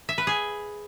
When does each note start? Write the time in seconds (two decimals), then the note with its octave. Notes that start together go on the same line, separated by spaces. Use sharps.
0.09 E5
0.18 B4
0.27 G#4